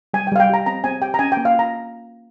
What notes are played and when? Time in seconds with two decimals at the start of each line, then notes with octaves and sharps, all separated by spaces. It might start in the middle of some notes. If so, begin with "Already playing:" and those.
0.14 G3 G#5
0.27 G5
0.32 G3 F5
0.40 G5
0.50 G4 A#5
0.66 C4 A#5
0.84 C4 G#5
1.01 G4 G5
1.14 A#5
1.19 C#4 G#5
1.32 G5
1.37 A#3
1.45 F5
1.54 F4
1.59 A#5